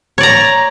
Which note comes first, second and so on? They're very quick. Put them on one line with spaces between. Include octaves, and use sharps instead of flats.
C#5 D5 A#5